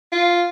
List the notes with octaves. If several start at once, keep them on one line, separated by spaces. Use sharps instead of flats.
F4